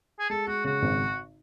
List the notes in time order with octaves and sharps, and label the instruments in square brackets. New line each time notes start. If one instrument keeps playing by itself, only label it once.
[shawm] G#4
[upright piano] G#3 [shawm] A4
[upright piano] G#3 [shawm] F#4
[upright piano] C#3 [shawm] F#4
[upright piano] G#1